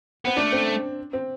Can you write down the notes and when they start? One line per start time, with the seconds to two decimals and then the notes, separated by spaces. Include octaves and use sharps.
0.25 B3 C4
0.37 A3 D4
0.52 C4
1.13 C4